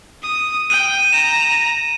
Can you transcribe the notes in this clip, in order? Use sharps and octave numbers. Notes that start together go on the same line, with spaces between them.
D#6
G5 D#7
A#5 E7